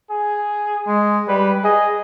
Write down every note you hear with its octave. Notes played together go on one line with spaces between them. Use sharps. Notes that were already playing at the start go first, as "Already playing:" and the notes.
G#4
G#3
G3 B4
G#4 D#5